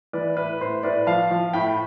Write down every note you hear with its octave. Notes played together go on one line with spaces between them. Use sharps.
E3 B4 D5
A2 B4
A2 C5
A2 B4 D5
F3 F5 A5
F3
A2 G5 B5